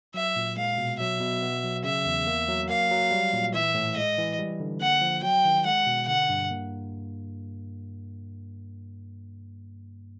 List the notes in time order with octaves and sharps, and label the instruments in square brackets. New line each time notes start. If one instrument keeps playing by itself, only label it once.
[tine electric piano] F#3 [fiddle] E5
[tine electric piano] A#2
[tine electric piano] G#3 [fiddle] F5
[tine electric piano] B2
[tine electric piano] F#3 [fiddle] E5
[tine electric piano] B2
B3
F#3
[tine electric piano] C#3 [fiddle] E5
[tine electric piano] E2
A#3
F#3
[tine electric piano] A#3 [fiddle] F5
[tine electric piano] F#3
G3
A#2
[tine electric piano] E3 [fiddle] E5
[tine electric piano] A2
[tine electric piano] G#3 [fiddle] D#5
[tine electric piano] E3
G3
D3
[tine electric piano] A#3 [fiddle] F#5
[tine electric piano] F3
[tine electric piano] F#3 [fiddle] G5
[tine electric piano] D#3
[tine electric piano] G#3 [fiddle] F#5
[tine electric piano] B2
[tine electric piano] D3 [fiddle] F#5
[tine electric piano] G2
A#3